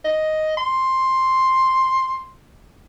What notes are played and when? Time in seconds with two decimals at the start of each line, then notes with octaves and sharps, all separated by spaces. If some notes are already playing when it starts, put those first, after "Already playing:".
0.05 D#5
0.57 C6